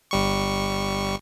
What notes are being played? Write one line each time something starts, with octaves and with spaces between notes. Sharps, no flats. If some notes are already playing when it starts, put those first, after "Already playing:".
G1 G3 C#6